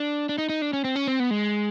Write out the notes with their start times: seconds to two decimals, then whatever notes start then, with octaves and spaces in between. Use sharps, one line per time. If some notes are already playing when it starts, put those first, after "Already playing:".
Already playing: D4
0.29 D4
0.38 D#4
0.49 D#4
0.62 D4
0.73 C#4
0.84 C4
0.96 C#4
1.08 C4
1.20 B3
1.31 G#3